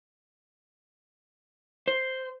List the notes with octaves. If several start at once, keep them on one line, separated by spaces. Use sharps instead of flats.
C5